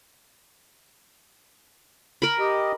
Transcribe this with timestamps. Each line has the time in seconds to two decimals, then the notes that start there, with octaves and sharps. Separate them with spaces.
2.22 A#4 B5
2.40 G4 D#5